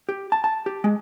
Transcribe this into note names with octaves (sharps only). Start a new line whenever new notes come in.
G4
A5
A5
G4
G#3